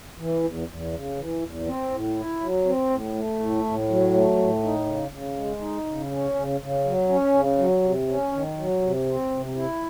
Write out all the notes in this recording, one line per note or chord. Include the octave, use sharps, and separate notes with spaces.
E3
E2
E2
C#3
E3
E2
C4
A2
E4
F#3
C4
A2
A3
A2
A2
F#3
A3
A2
D#4
C#3
C#3
G#3
D#4
C#3
C#4
C#3
C#3
F#3
C#4
C#3
F#3
C3
C#4
D#3
F#3
C3
C4
C3
E4